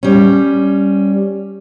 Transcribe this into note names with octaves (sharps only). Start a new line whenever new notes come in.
G3 C#4